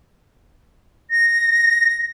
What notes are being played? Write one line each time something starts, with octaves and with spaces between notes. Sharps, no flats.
A#6